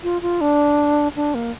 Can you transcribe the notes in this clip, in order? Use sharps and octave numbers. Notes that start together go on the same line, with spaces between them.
F4
F4
D4
D4
A#3